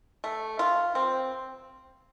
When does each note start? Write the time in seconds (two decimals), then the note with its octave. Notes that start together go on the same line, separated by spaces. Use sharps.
0.24 A3
0.59 F4
0.95 C4